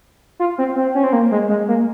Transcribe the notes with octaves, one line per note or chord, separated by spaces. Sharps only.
F4
C4
C4
C#4
C4
A#3
G#3
G#3
A#3